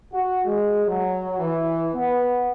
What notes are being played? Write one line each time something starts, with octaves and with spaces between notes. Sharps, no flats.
F#4
G#3
F#3
E3
B3